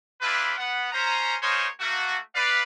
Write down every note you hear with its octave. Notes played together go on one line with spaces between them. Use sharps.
D4 E4 F4 G4 B4
B3 F#5
C#4 C5 A#5
A#3 D#4 F4 G#4 C5 C#5
A3 A#3 F#4
B4 D5 F5